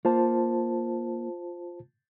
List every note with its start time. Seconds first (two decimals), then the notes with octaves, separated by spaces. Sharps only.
0.05 A#3 F4 C5 A5